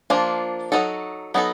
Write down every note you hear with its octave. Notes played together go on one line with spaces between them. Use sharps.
F3 A#3 D4 F4
F#3 B3 D#4 F#4 A4
F#3 B3 D#4 F#4 A4